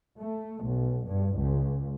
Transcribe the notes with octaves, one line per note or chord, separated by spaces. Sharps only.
A3
B1
G2
C#2